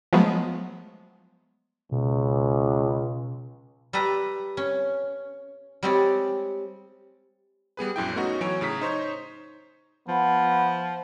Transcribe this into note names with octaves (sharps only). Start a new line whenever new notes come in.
F3 F#3 G#3 A3 B3
C#2 B2
G3 A4 B4 A#5
C#4
G3 G#3 C4 G4 C#5 D5
G3 B3 G#4 B4
A#1 F#2 E4 G5
A3 B3 C#4 D#4 F#4
E3 F#3 C#5 G#5 D7
A2 C#3 A#5 B6
D#4 C5 C#5
F3 B3